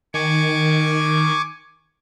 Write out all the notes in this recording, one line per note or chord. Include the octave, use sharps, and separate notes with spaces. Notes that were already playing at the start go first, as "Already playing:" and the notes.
D#3 G#5 C#6 D6